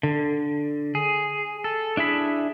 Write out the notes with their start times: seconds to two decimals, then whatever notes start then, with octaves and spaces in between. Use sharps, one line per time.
0.03 D3
0.95 G#4
1.64 A4
1.97 D4 E4 G#4 B5